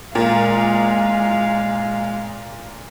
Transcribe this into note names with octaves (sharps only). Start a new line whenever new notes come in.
A#2 G#3 F5